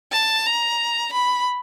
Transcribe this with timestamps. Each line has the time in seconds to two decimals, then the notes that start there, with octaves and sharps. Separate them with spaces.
0.12 A5
0.46 A#5
1.13 B5